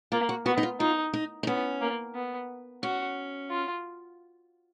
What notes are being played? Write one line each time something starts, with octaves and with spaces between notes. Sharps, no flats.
A#3 F4
F#4
B3 F#4
D#4
F4
D#4 F4
D#4
D#4
B3 C#4
A#3
B3
C#4 F#4
F4